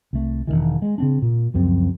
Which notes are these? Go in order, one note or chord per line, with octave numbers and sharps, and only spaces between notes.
C2 A3
E1 A#1 D#3 E3
G#3
C#3 C4 D4
A#2
C#2 F#2 F3 C4